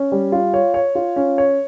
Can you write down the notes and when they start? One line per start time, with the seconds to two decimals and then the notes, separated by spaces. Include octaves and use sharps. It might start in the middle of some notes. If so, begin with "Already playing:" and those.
Already playing: C#4
0.12 G3
0.32 F4
0.54 C#5
0.74 C#5
0.95 F4
1.16 C#4
1.38 C#5